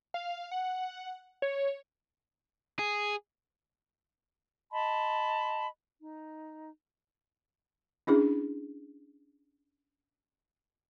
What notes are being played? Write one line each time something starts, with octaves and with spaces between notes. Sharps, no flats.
F5
F#5
C#5
G#4
D#5 A5 B5 C6
D#4
C#4 D4 E4 G#4